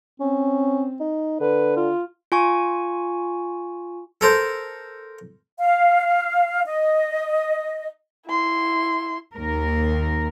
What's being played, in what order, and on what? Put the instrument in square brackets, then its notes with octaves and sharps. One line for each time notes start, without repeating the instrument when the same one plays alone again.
[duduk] C4 [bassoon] C#4
[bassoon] D#4
[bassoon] D3 [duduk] B4
[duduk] F4
[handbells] F4 G#5 C#6
[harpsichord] A4 A#4 C5
[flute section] F5
D#5
[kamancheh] E4 C6
[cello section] D#2 A#4